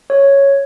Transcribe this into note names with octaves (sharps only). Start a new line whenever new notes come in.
C#5